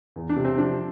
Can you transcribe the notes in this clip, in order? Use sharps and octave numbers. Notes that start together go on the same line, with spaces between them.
E2
D4
C3
C4
F3 D4